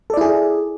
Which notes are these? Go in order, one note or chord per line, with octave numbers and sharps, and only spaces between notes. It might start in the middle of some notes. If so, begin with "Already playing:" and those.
E4 G#4 A4 D5